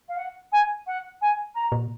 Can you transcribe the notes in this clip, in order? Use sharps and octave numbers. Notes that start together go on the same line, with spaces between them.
F5
F#5
G#5
F#5
G#5
A#5
A#2